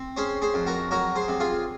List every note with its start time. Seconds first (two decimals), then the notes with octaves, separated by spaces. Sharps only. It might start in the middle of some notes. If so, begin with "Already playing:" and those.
Already playing: C4
0.17 C#4 G#4 C5
0.42 G#4 C5
0.54 F2
0.67 F#4 A#4
0.91 F#3 F#4 A#4
1.16 G#4 C5
1.28 C3
1.40 F4 G#4